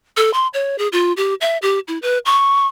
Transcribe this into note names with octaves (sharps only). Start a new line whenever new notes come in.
A4
C6
C#5
G#4
F4
G4
E5
G4
E4
B4
C#6